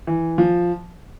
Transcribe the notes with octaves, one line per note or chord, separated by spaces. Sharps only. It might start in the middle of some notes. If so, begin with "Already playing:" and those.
E3
F3